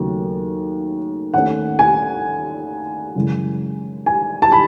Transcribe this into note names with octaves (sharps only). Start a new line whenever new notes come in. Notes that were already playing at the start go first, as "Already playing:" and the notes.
Already playing: D#2 C#3 F#3 A3
D#2 D#3 A3 C#4 F#5
G#5
F#2 C#3 E3 G#3
G#5
A5
B5